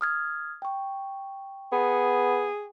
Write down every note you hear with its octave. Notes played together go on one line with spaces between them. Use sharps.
D#6 F6 G#6
G5 C#6
B3 G#4